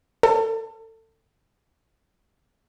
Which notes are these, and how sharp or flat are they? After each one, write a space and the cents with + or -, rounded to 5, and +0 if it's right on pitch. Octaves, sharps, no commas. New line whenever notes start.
A4 +30